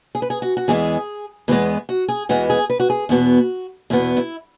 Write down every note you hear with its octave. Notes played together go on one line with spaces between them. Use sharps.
G#4
B4
G#4
F#4
F#4
E2 E3 G#3 B3 G#4
E2 E3 G#3 B3 B4
F#4
G#4
E2 E3 G#3 B3 F#4
G#4
B4
F#4
G#4
E2 B2 B3 F#4
E2 B2 B3 E4
E4